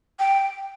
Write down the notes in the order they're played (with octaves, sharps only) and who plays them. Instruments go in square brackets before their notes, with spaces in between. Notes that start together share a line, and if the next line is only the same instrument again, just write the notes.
[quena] G5